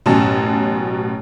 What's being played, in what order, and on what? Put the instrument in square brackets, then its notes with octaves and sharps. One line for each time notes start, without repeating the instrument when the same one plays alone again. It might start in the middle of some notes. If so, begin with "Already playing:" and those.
[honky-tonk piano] A1 F#2 B2 C#4 A5